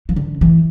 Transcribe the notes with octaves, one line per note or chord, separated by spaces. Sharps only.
E3
D3
E3